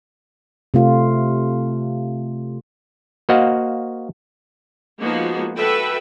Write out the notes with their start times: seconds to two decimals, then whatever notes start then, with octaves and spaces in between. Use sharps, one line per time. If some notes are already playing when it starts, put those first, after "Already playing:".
0.74 C3 A3 F4
3.29 A#3 F#4 C5 D#5 F5 F#5
4.99 F3 G#3 A#3 B3 D#4 F#4
5.57 F#4 A4 B4 E5 G5